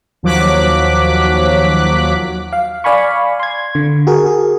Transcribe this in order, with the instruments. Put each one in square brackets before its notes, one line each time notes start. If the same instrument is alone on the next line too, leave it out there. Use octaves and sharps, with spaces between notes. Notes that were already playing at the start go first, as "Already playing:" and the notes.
[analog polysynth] D#2 F3 F#3 D6 F#6 B6
[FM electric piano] F5
D5 F5 G#5 B5 C#6
C6 G#6
D3
F#4 G#4 A#4
G#4